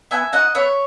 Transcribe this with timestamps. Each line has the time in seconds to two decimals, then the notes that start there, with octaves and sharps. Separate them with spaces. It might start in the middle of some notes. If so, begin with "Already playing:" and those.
0.11 B3 E5 G#5
0.33 D#4 F#4 D#5 F#5
0.55 B3 C#5 E5